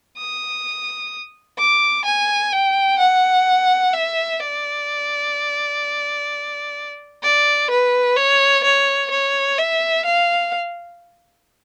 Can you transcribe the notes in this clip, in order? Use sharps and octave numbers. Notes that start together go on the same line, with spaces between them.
D#6
D6
G#5
G5
F#5
E5
D5
D5
B4
C#5
C#5
C#5
E5
F5